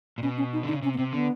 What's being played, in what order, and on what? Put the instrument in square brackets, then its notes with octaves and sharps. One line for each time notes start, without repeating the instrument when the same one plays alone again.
[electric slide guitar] A#2
[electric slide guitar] B2 [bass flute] C#4
[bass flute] C#4
D#4
[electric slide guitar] D3 [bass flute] D#4
[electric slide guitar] C#3
[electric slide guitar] C3 [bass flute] C#4
[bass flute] B3
[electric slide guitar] C3 [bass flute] C4
[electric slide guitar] D3 [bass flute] B3